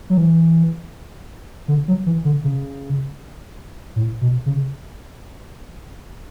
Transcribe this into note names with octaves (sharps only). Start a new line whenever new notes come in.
F#3
E3
D3
F#3
E3
D3
C#3
A2
B2
C#3